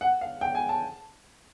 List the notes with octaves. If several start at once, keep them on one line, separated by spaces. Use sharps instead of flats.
F#5
F5
G5
G#5
A5